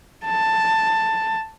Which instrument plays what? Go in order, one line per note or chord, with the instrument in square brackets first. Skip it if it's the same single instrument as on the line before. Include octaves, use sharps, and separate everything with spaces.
[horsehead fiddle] A5